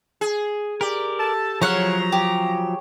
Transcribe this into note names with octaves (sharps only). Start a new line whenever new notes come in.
G#4
G4 A#4 D5
A4 A5
C#3 F3 F#3 C#5 F#5 A#5 F6
G4